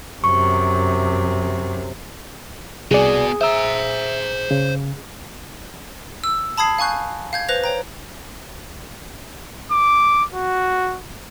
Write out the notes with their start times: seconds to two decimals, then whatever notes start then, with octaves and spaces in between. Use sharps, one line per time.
0.24 F#2 C3 C#6
2.91 C2 B3 F#4 G#4 D5
3.41 C5 E5 A#5 E6
4.51 C#3
6.24 E6
6.58 A5 B5 D#6 G#6 C7
6.78 F5 G#5 C#6 F#6 G6
7.33 F5 G6 G#6
7.49 B4 C5 F#6 A#6 F7
7.64 C#5 G5 A#5
9.72 D6
10.34 F#4